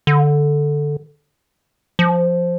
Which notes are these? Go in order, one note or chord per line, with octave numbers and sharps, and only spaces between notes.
D3
F3